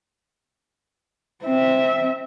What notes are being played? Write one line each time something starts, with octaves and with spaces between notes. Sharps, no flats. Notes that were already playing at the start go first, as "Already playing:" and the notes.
C4 E5